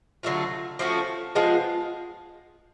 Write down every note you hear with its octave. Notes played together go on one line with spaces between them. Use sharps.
D3 F#3 A3 F4
F3 A3 C#4 F#4
F3 G#3 B3 F4